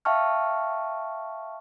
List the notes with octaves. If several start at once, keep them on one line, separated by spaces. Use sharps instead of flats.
E5 F5 G5 A5 C#6 F6